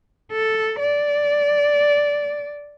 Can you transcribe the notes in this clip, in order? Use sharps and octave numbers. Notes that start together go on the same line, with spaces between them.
A4
D5